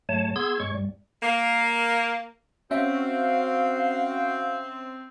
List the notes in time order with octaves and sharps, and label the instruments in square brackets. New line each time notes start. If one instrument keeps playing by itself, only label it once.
[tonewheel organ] G#2 F#3 A3 C#5 A5
B3 G#4 C6 E6 G#6
G2 G#3 C#5 C#6
G2 G3
[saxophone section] A#3
[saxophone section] C4 [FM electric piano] C#4 E5 [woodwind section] F#4 F5